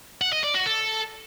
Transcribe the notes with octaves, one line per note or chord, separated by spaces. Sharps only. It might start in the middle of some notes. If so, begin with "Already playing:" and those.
F#5
D#5
D5
F#4
A4